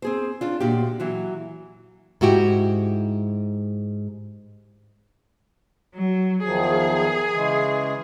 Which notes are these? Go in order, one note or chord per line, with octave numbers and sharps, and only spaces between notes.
C4 G#4 C5
C#4 D4 F4
D2 A#2 F#4 G4
E3 F#3 F#4
G#2 E4 F#4 G4
F#3
E2 D#3 F3 G#4
C#3 E3 G#3